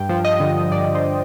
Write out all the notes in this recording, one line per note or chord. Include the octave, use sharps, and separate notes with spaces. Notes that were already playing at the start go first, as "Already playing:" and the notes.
Already playing: G2 G5
F3
D#5
D3
G2 D5
C5